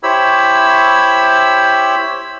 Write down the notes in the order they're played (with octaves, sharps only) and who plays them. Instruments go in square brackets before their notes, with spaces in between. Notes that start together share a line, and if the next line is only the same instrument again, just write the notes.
[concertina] E4 G4 C5 C#5 B5 E6